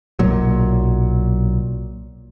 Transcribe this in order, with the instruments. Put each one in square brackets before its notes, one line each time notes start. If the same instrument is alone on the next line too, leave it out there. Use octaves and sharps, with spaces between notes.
[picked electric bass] B1 A#2 F#3